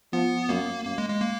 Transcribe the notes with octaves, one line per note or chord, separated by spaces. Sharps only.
F3 B3
F#2 A#3
F#2 A#3
G#3
G#3
A#3